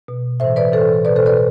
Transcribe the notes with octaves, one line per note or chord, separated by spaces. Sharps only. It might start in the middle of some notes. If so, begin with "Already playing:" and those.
B2
A2 E3 C5 E5
B4 D5
A2 E3 A4 C5
B2 B4 D5
A4 C5
B4 D5